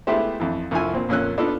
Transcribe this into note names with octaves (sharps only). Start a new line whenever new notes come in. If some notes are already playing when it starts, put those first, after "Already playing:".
G#3 A3 B3 E4 G4 C5
F2 E3
C2 F2 E4 F4 G#5
A#2 C4
F2 A#2 C#4 E6 F#6
B3 D4 D#4 F4 A4